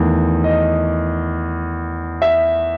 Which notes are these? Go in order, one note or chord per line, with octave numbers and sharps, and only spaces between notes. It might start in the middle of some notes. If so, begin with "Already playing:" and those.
Already playing: E2 D#3 A3
D#5
E5